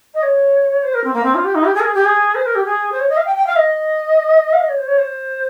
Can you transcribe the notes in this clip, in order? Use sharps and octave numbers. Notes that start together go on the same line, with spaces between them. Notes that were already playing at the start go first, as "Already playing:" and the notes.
D#5
C#5
C5
A#4
C4
A#3
C4
F4
G4
D#4
G4
G#4
A#4
G#4
G4
G#4
C5
A#4
G4
G#4
C5
C#5
D#5
F5
G5
G5
F5
D#5
F5
D#5
C#5
C5
C#5
C5